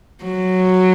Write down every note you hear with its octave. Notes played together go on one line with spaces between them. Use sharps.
F#3